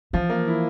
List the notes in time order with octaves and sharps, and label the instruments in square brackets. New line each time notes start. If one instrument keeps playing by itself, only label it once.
[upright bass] E3 [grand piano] F3
[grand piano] A#3
E4